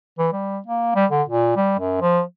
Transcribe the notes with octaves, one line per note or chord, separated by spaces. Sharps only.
E3
G3
A#3
G3
D3
A#2
G3
F#2
F3